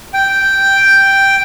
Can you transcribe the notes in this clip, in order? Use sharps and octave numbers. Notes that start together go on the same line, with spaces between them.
G5